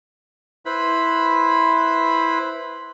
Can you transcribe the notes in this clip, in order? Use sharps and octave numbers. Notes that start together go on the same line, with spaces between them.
E4 B4 C5 B5